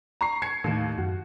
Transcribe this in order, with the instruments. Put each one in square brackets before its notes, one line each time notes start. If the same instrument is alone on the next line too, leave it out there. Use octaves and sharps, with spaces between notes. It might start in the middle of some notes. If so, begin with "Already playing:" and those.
[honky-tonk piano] A#5 C#6 C7
G#6 C7 C#7
[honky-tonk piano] D#2 [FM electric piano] A2 D#3
[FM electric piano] F#2 [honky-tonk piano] F#4